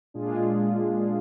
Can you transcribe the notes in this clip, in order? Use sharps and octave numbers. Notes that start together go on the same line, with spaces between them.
A#2 G#3 D4 F4 G#4